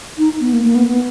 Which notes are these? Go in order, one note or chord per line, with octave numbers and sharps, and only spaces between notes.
D#4
B3
A#3
A#3
B3
B3